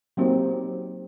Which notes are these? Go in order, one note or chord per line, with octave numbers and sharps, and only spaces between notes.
F#3 A#3 C4 D#4 G4